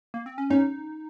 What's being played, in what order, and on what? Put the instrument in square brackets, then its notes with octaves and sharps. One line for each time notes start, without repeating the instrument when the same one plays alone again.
[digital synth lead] A#3
C4
C#4
[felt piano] C#4 [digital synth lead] D#4